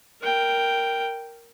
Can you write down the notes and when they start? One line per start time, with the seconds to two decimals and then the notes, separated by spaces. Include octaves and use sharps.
0.22 A#4 G5